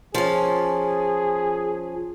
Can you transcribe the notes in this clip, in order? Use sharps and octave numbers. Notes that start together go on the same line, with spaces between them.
F3 C#4 G#4